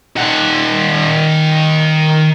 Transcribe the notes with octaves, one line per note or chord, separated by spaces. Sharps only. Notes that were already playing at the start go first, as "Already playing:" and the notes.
D#3 F#5